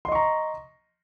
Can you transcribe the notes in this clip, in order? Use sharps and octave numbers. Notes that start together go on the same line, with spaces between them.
D#5 A#5 C6 C#6